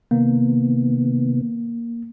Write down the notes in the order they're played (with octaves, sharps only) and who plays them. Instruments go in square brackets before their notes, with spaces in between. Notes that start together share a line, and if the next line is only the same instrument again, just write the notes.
[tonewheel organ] C3 D#3 B3 [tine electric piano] A#3